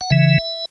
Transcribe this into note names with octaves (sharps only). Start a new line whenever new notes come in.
F#5
C#3 E3 E5